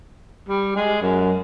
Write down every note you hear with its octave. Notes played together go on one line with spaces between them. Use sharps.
G3
G#3
F#2